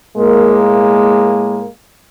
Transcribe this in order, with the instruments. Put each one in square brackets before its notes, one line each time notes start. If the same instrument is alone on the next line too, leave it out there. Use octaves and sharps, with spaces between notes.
[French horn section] A2 G#3 A#3